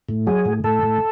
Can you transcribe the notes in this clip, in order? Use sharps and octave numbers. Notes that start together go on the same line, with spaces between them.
A2
F#3 G#4
A2
A2 A4
A2